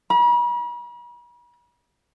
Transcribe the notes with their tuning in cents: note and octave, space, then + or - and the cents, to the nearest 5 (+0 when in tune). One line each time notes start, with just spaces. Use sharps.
B5 -45